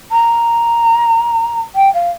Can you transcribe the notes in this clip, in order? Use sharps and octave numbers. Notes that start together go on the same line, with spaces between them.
A#5
G5
F5